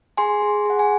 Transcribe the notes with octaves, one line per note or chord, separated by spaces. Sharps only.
G#4 G#5 C6
G#4
G#4 F#5
G#5